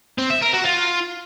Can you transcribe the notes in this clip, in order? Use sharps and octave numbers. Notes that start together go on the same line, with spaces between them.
C4
E5
A#4
F#4
F4